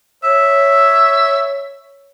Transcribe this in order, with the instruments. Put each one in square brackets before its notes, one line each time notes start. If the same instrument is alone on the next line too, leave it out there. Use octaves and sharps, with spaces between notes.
[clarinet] C#5 [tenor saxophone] E5